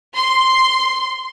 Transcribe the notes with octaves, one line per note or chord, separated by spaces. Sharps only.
C6